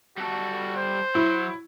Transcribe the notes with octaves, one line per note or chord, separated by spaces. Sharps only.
G3 F#4 A4
C5
F#3 E4